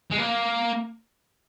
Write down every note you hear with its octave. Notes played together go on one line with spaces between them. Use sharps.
G#3
A#3